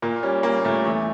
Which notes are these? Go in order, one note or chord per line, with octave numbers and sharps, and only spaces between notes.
A#2 A#3
G3 C#4
G3 A#3
A#2 A3
E2 A3